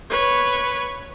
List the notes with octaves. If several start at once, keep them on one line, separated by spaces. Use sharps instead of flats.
B4 C#5